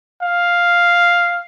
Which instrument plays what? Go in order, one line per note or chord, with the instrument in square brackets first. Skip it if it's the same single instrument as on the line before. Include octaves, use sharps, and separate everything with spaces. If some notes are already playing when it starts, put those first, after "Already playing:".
[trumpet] F5